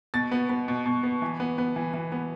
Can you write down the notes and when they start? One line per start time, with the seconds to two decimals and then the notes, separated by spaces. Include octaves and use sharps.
0.14 B2 A6
0.31 B3
0.49 B3
0.68 B2
0.86 B2
1.03 B3
1.22 E3
1.40 B3
1.58 B3
1.76 E3
1.94 E3
2.12 B3